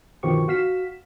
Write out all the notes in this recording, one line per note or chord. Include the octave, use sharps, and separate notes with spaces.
G1 B2 D#3 F3 G4 C#6
F#4 F5 B6 E7